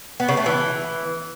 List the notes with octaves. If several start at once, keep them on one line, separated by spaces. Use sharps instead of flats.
B3
C#3
A3
E3